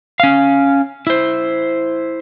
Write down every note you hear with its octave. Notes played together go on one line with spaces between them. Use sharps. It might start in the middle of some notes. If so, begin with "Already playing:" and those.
C#4 F5
E4 C5